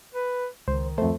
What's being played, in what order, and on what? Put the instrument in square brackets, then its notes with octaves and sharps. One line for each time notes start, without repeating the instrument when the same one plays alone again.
[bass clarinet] B4
[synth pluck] C#2 [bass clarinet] D#3 [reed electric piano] C5
[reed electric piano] F2 A3 [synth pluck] C5